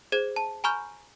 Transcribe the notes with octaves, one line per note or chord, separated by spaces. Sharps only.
G#4 C5 G#6 D#7
A5
G#5 A#5 B5 C#6 F6 G6